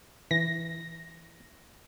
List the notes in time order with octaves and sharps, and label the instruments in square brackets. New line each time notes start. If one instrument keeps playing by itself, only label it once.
[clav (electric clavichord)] E3 [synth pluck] A#6